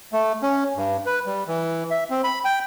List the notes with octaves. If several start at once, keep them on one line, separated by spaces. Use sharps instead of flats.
A3
C#4
G2
B4
G3
E3
E5
C4
B5
G5